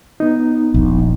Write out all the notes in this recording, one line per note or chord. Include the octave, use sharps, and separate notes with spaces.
B3 D#4
D#1 A#1